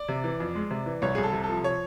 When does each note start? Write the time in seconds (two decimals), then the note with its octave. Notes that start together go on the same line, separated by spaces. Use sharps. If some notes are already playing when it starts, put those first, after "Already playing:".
Already playing: D5
0.08 C3
0.24 E3
0.40 F2
0.55 G#3
0.71 C3
0.86 E3
1.02 C2 C#5
1.15 G#4
1.18 C2
1.23 A4
1.33 C3
1.43 A4
1.49 F3
1.64 C#5